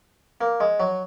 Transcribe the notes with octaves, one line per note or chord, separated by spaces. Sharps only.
A#3
G#3
F#3